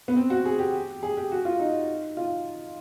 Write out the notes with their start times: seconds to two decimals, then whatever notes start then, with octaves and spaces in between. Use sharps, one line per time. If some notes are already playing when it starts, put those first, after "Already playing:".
0.08 B3
0.16 C4
0.30 F#4
0.45 G#4
0.59 G4
1.03 G#4
1.17 G4
1.32 F#4
1.45 F4
1.59 D#4
2.17 F4